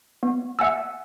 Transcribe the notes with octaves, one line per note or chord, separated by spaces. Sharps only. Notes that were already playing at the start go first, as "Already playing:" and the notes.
B3
E5 F#5 G#5 E6